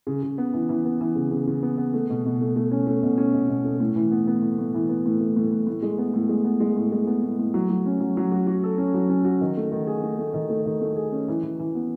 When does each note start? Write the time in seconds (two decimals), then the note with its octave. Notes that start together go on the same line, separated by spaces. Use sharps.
0.07 C#3
0.23 C#3
0.38 B3
0.53 E3
0.69 E3
0.85 B3
1.01 E3
1.16 C#3
1.31 C#3
1.47 C#3
1.63 B3
1.78 B3
1.93 A3
2.10 B2
2.26 B2
2.41 A3
2.56 A3
2.71 C#4
2.87 A3
3.03 B2
3.18 C#4
3.34 B2
3.49 B2
3.64 A3
3.80 A2
3.96 E3
4.11 B3
4.27 B3
4.42 A2
4.58 A2
4.74 E3
4.89 B3
5.06 A2
5.20 A2
5.37 A2
5.52 A2
5.67 A2
5.82 G#3
5.98 B3
6.14 A2
6.29 G#3
6.45 B3
6.60 G#3
6.76 A2
6.92 G#3
7.07 B3
7.23 A2
7.39 A2
7.54 F#3
7.70 F#3
7.86 C#4
8.00 F#3
8.17 F#3
8.32 F#4
8.47 F#4
8.64 A4
8.78 C#4
8.94 F#3
9.10 C#4
9.25 F#4
9.41 D#3
9.57 A3
9.72 D#3
9.87 G#4
10.03 A3
10.19 A3
10.34 D#3
10.50 A3
10.66 D#3
10.82 A3
10.96 G#4
11.12 C#4
11.28 E3
11.43 E3
11.59 E3
11.75 B3